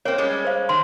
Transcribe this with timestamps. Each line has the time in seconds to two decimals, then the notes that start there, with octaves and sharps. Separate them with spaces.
0.05 A#3 C4 C#5
0.18 G3 G#3 C#4
0.45 C5 F5
0.69 D#3 C6